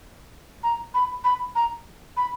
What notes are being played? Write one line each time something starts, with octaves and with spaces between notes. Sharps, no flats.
A#5
B5
B5
A#5
B5